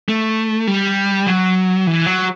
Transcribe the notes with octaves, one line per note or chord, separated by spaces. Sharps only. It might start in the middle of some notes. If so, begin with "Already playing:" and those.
A3
G3
F#3
E3
F#3